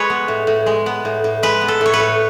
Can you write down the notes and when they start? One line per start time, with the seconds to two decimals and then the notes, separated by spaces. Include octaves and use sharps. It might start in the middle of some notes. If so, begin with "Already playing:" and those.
Already playing: G#3 B4 C#5
0.10 B3
0.28 A2
0.47 A2
0.66 G#3
0.86 B3
1.05 A2
1.24 A2
1.43 G#3 B4
1.61 B3
1.68 A4
1.81 A2 C#5
1.93 B4
2.00 A2